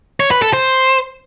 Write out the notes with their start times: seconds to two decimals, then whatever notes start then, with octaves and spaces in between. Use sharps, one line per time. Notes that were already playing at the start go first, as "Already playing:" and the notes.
0.20 C#5
0.31 B4
0.42 A4
0.53 C5